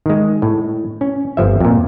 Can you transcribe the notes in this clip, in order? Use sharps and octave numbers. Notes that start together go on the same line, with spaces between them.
D#3 G#3
A2
C#4
G1 F3 E5
F2 A#2